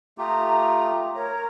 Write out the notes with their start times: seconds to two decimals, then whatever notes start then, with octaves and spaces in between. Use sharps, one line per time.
0.18 A3 F4 G4 A#5 D#6
1.15 A#4 C#5 A#5